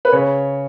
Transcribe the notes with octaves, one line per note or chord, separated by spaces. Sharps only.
B4
C#3 C#5